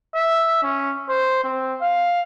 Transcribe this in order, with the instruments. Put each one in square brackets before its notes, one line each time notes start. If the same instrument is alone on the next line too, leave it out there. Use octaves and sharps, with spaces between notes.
[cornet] E5
C#4
C5
C4
F5